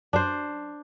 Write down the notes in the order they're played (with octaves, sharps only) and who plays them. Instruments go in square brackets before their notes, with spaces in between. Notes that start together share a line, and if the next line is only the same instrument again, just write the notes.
[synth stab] F#2 [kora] D4 C5